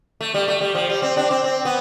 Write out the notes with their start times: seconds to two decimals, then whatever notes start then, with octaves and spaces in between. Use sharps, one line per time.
0.21 A3
0.34 G3
0.48 A3
0.61 G3
0.75 F3
0.90 G3
1.02 C4
1.17 D4
1.31 C4
1.44 C4
1.65 B3